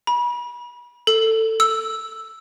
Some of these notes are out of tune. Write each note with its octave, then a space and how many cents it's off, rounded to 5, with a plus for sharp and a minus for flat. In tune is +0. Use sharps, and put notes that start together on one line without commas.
B5 -35
A4 +15
E6 +0